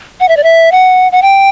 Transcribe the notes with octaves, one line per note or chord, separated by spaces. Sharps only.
F#5
E5
D5
E5
F#5
F#5
G5